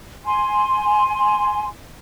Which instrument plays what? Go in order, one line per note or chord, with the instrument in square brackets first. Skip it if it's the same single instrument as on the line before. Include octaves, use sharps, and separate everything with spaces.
[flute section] G#5 C6